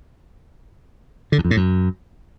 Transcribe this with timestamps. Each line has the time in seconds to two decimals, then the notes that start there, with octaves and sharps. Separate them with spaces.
1.32 D3
1.38 E2
1.45 F2
1.51 A2
1.57 F#2